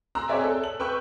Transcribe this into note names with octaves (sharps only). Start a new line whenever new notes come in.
A#5 C6 E6 F#6
C4 G#4 C#5 D5 E5 G#5
A4
F#7
B4 G5 C#6 E6 F#6 G6